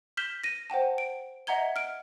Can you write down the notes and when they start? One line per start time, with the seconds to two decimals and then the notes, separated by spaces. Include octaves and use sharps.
0.17 F6 G6 B6 E7 G7
0.44 A#6 D#7
0.70 C5 F#5 G5 A5
0.98 D7
1.47 D#5 E5 F#5 A#5 G#6 G7
1.76 F6 D7